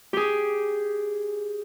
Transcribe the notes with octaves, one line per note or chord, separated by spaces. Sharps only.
G4 G#4